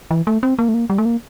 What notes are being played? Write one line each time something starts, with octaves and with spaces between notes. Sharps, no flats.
E3
A3
C4
A#3
A3
A#3
G3
A3
A#3